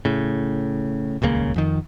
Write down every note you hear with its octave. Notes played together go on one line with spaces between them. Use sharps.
A2 C#3
D#1 C#2 C#3 A#3
F2 D#3